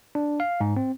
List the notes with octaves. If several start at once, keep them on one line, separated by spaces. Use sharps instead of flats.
D4
F5
G#2
C4